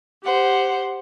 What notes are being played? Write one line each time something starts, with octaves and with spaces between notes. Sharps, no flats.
G4 C5 F#5